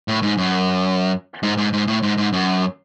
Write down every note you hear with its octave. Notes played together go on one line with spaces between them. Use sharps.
A2
G#2
F#2
G#2
G#2
G#2
A2
G#2
G#2
F#2